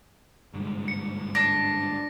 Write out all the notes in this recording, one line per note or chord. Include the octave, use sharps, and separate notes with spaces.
G1 C2 G#2
C#7
D4 A#6